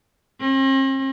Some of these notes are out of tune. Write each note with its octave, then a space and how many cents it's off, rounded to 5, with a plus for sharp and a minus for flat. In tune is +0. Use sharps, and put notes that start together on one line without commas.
C4 +45